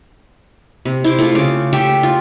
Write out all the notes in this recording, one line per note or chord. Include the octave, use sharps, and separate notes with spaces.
C3
E4 C5 D6
A3 F4
C#3 D6
A3 G4 E5 G5
F4